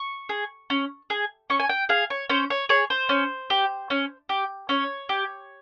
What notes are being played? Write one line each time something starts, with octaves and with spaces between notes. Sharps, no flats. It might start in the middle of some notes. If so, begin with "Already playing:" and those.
Already playing: C#6
G#4
C#4
G#4
C#4 C#6
G#5
G5
G#4 F5
C#5
C#4 C5
C#5
G#4 C#5
C5
C#4
G4
C#4
G4
C#4 C#5
G4